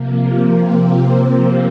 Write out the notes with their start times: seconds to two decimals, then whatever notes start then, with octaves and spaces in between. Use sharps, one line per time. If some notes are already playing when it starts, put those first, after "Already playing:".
Already playing: C3 F3 A#3
0.46 C4